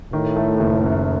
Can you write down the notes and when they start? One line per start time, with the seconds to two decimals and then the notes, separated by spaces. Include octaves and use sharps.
0.13 A2 D#3
0.36 A3
0.60 F#1
0.83 F#2